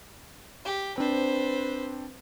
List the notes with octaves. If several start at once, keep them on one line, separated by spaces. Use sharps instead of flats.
G4
C4 D4 B4 C5